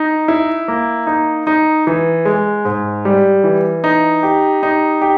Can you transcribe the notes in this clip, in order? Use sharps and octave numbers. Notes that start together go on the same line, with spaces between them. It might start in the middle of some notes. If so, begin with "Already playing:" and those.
Already playing: D#4
E4
A#3
D#4
D#4
E3
G#3
G#2
G3
E3
D#4
G4
D#4
G4